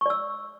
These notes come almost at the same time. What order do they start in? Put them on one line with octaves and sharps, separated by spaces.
C#6 D5 E6